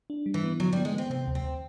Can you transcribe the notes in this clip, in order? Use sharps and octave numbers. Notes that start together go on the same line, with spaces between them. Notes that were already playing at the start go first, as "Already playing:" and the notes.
D4
G3
E3
B3
D3 F#3
G3
B3
G#3
B3 C4
C3 C4
D2
C4
D2